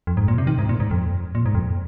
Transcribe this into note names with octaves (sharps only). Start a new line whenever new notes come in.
F2
G#2
A#2
C3
D#3
G#2
A#2
G#2
F2
A#2
G#2
F2